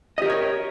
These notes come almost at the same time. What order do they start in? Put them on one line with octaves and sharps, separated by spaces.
D#5 G4 A#4 C#5